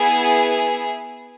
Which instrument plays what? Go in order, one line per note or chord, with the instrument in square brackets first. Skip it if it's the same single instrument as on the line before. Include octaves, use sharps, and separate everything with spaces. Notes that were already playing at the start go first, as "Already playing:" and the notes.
Already playing: [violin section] B3 E4 G#4 G#5